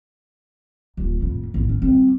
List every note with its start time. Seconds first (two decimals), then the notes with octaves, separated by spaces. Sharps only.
0.97 D#1
1.20 F2 A2
1.54 A1 A2
1.69 C#4
1.82 G3 C4